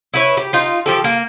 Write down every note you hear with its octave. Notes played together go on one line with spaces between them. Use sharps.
E4 B4 C#5
G4
D#4 F4
F3 G4 A4
A#3